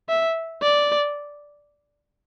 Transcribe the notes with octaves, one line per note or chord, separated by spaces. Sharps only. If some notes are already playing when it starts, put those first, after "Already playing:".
E5
D5